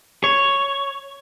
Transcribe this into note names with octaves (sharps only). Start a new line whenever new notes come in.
C#5